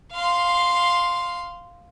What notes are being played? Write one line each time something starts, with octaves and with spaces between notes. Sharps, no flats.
F5 C6